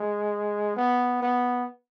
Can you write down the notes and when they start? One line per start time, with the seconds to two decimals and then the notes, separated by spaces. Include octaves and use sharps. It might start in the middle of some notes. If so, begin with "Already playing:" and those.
Already playing: G#3
0.76 B3
1.22 B3